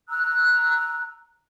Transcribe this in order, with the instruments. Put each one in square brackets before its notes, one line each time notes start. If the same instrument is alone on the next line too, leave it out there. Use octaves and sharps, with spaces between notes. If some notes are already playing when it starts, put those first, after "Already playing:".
[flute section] A#5 E6 F#6